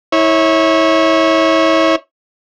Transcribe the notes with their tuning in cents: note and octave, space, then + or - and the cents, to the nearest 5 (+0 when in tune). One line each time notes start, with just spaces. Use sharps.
E4 -30 C#5 -15